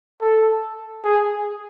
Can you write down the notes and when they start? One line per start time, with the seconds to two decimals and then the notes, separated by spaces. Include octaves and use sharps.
0.21 A4
1.04 G#4